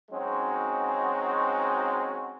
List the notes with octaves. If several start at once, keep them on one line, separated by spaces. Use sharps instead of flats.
F#3 G#3 C4 C#4 D#4 F#4